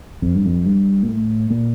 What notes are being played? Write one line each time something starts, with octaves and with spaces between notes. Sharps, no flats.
F2
G2
F2
G2
A#2
A2
A#2